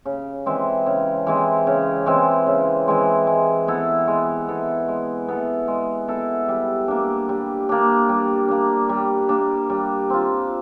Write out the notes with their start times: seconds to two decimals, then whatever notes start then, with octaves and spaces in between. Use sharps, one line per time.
0.05 C#3
0.46 E3 G#3 C4
0.86 C#3
1.27 E3 G#3 C4
1.67 C#3
2.06 E3 G#3 C4
2.47 C#3
2.88 E3 G#3 C4
3.27 G#3
3.68 B3 E4 A4
4.08 G#3
4.48 B3 E4 A4
4.88 G#3
5.28 B3 E4 A4
5.68 G#3
6.08 B3 E4 A4
6.48 G3
6.88 A#3 D4
7.29 G3
7.69 A#3 D4
8.09 G3
8.48 A#3 D4
8.89 G3
9.29 A#3 D4
9.70 G3
10.10 C4 F4